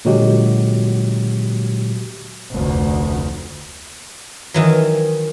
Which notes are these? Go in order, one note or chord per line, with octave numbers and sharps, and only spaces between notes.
A#2 D3 F#3 G#3 F#4 G4
F1 D2
D#3 E3 F#3